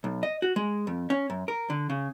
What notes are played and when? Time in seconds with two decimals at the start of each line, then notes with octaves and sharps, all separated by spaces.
0.04 B1
0.23 D#5
0.42 F#4
0.56 G#3
0.87 F2
1.10 C#4
1.30 F#2
1.48 A#4
1.70 D3
1.90 C#3